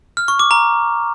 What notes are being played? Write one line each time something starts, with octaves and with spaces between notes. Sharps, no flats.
F6
C#6
D6
A#5